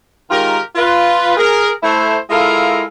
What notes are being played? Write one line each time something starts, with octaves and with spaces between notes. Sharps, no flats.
D#3 G#3 F4 G4 A#4
F4 B4
G#4 A#4
A3 E4 C5
G#3 E4 F4 A4 A#4 F5